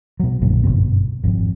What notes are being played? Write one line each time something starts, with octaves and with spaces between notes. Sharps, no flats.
B2 F#3
A#1 F#2 A#2 D3
G1 F#2 B2 B3
G#1 F2